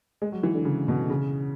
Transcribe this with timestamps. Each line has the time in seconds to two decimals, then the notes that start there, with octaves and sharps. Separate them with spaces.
0.22 G#3
0.32 F#3
0.43 E3
0.54 D3
0.65 C#3
0.88 B2
1.10 C#3